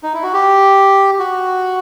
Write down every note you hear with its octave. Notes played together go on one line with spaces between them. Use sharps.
D#4
E4
F#4
G4
F#4